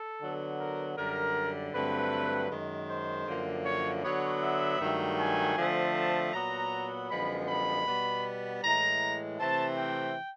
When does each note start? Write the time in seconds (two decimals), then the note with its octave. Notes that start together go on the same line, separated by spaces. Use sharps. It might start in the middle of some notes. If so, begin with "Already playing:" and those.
Already playing: A4
0.20 D3 F#3 B3
0.59 A#4
0.97 F#2 D3 G3 A#4
1.73 G2 D3 F#3 A3 C4 B4
2.50 F#2 D#3 G#3
2.89 C5
3.27 F#2 D3 F3 A#3
3.65 C#5
4.03 D3 F#3 B3 C#5
4.42 E5
4.80 G2 D#3 F#3 A3
5.18 G#5
5.57 D3 F3 A3 C4
5.95 A5
6.33 A#2 F#3 B3 A#5
7.10 F#2 D3 F3 G#3 B3 B5
7.48 B5
7.87 B2 G3 B3
8.63 A2 E3 G#3 A#5
9.39 C3 E3 A3 C4 A5
9.77 G5